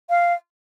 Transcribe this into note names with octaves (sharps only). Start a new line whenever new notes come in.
F5